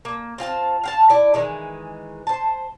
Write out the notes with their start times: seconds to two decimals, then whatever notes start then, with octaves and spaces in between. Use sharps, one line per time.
0.05 A#3
0.38 C4 F4 G5 A5
0.84 F5 F#5 A5
1.10 E4 D5
1.34 D#3 E3 G#3
2.27 C5 A5